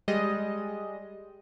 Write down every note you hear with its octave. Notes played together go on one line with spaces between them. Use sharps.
G3 G#3 D#5